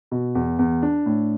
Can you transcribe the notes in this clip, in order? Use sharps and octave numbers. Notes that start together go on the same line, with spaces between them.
B2
E2
E2
D4
A2